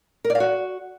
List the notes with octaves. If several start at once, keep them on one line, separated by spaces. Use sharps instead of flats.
A#4
D5
F5
F#4